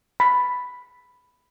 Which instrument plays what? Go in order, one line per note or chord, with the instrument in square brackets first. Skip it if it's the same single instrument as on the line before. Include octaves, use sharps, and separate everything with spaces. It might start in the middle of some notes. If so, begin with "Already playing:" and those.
[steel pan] B5